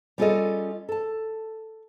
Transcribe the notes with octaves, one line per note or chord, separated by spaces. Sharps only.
G3 C#4 F4 G#4 A4 D#5
A4 A5